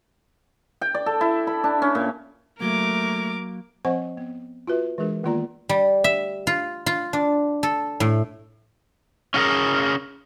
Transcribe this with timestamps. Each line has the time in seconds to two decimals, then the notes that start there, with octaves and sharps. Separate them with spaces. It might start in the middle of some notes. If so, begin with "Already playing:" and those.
0.81 G5
0.94 D5
1.06 A4
1.21 E4
1.47 B5
1.64 D4
1.82 C#4
1.95 A#2
2.61 F#3 A3 A#3 A#4 D6
3.85 F3 C4 C5 D#5 F#5 C#6
4.17 B3
4.68 F4 F#4 B4 E5
4.98 E3 G#3 D4 G#4 A#4
5.23 D#3 A#3 B3 F4 D5 A#5
5.69 G3
6.04 E5
6.47 F4
6.86 F4
7.13 D4
7.63 A4
8.00 A2
9.34 C#4 F4 F#4 G#4 A#4